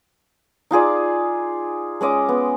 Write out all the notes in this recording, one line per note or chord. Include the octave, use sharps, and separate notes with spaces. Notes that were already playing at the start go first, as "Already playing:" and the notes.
D#4 F4 G#4 D5
G#3 C#4 D#5 D6
B3